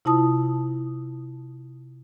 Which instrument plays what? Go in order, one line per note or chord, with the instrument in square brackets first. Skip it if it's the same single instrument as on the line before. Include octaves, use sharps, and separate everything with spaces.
[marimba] C3 E4 F4 A5 D#6